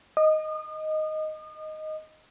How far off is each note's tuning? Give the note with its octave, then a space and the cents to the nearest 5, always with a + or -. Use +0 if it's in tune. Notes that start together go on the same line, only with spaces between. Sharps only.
D#5 +0 D#6 -35